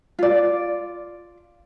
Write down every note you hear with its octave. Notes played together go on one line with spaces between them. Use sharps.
F4 D5